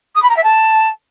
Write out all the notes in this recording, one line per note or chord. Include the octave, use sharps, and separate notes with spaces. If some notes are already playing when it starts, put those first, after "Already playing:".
D#6
B5
A#5
E5
A5